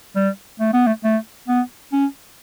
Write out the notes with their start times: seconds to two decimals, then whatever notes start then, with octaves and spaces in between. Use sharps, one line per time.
0.16 G3
0.60 A3
0.74 B3
0.87 A3
1.04 A3
1.48 B3
1.93 C#4